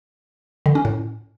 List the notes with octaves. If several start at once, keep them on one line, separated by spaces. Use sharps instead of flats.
D3
C#4
A2